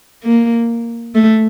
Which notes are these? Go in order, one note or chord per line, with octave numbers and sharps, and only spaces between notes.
A#3
A3